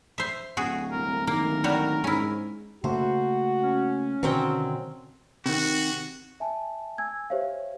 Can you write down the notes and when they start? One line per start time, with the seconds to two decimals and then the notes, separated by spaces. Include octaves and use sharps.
0.18 C5 E5
0.57 D1 F#4 G#4
0.91 C2 A#4
1.27 D#3 A#3 A#4
1.64 G3 F#4 C#5
2.04 G#2 C#4 E4
2.84 C#3 A3 A#3 F#4 C5
3.62 C#4
4.23 B2 D3 D#3 F#3 C4 G5
5.46 C3 D#3 F#4
6.40 E5 G#5 A5
6.98 G#5 E6 G#6
7.30 G4 C5 C#5 E5 F5